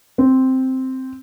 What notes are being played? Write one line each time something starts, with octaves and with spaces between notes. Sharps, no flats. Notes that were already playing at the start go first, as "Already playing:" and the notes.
C4